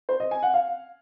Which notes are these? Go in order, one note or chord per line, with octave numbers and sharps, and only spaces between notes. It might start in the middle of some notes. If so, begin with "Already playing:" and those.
C5
D#5
G#5
F#5
F5